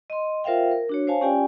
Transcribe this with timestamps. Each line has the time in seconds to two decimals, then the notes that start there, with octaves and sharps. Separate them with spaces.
0.10 D#5 C6
0.44 F4 A#4 C5 E5 F5 G5
0.71 A#4
0.89 D4 F#4 C#5
1.07 C5 C#5 F5 G#5 A5
1.21 C#4 F4 G4 D5 G5 G#5